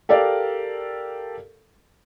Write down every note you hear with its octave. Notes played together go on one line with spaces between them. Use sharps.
G4 A4 A#4 D5 F5